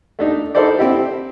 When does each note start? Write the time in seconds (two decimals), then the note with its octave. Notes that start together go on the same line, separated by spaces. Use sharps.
0.19 A3 D4 D#4
0.55 D#4 E4 A4 A#4 C5 D5
0.79 C4 E4 G4